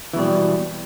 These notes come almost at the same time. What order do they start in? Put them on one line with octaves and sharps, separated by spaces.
E3 B2 G3